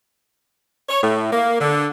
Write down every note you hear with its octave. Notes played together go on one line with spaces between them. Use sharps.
C#5
A2
A#3
D3